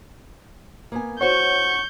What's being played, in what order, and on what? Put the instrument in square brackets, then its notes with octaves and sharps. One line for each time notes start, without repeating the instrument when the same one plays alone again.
[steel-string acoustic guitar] A#3 B3 G#5
[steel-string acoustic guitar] F#4 C5 [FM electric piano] C#5 F#5 [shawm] C#6 [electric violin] G6